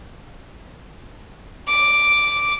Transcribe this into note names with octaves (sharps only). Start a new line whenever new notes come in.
D6